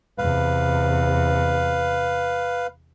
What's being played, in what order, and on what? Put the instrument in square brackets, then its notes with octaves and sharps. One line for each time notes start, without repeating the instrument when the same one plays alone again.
[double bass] E2 C3 [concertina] B4 F5